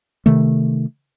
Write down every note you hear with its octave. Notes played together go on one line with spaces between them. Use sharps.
C3 D#3 A3